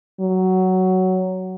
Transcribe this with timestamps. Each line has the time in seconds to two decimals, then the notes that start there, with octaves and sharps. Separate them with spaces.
0.20 F#3